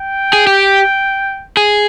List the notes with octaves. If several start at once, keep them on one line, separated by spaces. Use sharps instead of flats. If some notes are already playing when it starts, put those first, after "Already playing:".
Already playing: G5
G#4
G4
G#4